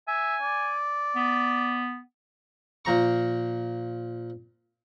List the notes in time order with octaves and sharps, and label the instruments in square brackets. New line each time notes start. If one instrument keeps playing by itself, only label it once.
[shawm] E5 [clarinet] G#5
[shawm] D5
[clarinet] B3
[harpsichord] A#2 F3 A#5 C#6